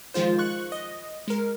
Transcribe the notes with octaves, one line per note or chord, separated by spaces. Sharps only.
D#3 F3 G#3 F4 C5
C#6 F#6
D#5
G#3 A#4